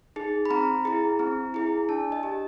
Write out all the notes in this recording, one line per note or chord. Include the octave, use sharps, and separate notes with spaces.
D#4 G#4
B5
C4 A#5
E4 G#4
C4
E4 G#4
D4 A5
D#5
G4